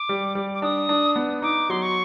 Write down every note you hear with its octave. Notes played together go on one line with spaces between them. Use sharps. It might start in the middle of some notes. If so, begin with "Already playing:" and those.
Already playing: D6
G3
G3
D6
D4 D#6
D4
B3
D#4 D6
F#3 C6
C#6